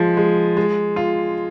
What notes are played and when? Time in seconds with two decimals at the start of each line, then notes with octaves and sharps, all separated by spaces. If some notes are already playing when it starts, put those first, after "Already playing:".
Already playing: F3 G#3
0.17 G#3
0.57 G#3
0.96 F4